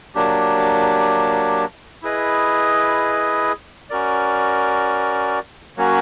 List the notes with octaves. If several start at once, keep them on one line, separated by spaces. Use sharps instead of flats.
F#3 A#3 D4 G4
E4 G#4 B4 D#5
C#4 F#4 A#4 D5
F#3 A#3 C#4 F#4